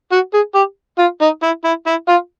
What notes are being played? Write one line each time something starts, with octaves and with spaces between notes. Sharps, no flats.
F#4
G#4
G4
F4
D#4
E4
E4
E4
F4